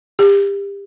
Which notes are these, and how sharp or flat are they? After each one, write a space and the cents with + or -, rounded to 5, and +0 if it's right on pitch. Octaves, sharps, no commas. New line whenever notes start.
G4 +30